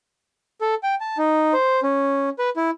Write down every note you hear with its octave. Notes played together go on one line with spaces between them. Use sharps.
A4
G5
A5
D#4
C5
C#4
B4
E4